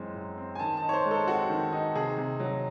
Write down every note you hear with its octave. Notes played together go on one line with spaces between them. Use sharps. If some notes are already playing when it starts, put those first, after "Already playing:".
Already playing: F#2 E3 G#3 C4
F#2
C4
G#5
D#3 A5
D#4 A5
C#5
C5
G#3
A4
C4 F#4
D#3
D#4
C3 G#4
C3
F#3